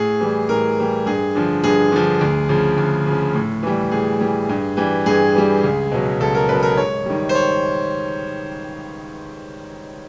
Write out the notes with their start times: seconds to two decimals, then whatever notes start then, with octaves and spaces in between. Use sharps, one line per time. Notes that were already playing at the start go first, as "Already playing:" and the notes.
Already playing: A2 G#4
0.20 E3 G3
0.49 A2 A#4
0.78 E3 G3
1.06 G2 G#4
1.35 D3 F3
1.64 G2 G#4
1.92 D3 F3
2.21 D2
2.49 C#3 F3
2.78 D2
3.06 C#3 F3
3.34 A2
3.63 E3 G3
3.91 A2 G#4
4.20 E3 G3
4.49 G2
4.77 E3 G3
5.06 G2 G#4
5.35 E3 G3
5.64 C#2
5.92 B2 F#3
6.20 C#2 A4
6.35 A#4
6.49 B2 F#3 B4
6.63 A#4
6.77 G#2 C#5
7.06 D#3 G3
7.29 C5
7.35 C#5